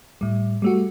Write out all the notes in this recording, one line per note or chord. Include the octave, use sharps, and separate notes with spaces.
A2 G3
G3 A3 F#4